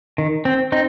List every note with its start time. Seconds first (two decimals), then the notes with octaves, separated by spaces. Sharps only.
0.18 D#3
0.45 C4
0.72 C4 D#4